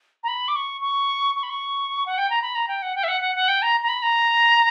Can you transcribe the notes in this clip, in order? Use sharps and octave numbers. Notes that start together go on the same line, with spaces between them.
A#5
B5
D6
C#6
C#6
C#6
B5
C#6
F#5
G5
A#5
B5
A#5
G5
F#5
G5
E5
F#5
F#5
F#5
G5
A#5
A#5
B5
A#5